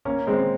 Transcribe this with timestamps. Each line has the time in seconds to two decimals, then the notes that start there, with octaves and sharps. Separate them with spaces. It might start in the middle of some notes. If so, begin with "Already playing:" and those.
0.05 A#3 C#4
0.27 G#3 C4